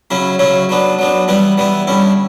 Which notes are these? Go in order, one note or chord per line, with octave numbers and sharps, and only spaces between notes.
C#3 F#3 C#4 E4
C#3 F#3 C#4 E4
F#3 B3 D4
F#3 B3 D4
E3 G3 B3 E4
E3 G3 B3 E4
D3 G3 C#4 E4